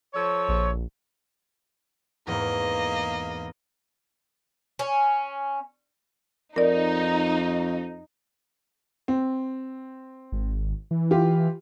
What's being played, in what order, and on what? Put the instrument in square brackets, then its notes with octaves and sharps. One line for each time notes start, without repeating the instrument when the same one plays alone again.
[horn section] F3 A4 C#5
[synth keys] A#1
[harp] E2 G#2 C4 [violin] A#3 D#5
[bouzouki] C#4
[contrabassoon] F2 [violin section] D#4 [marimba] A#4 D5
[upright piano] C4
[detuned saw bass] G#1
E3
[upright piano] F4 G4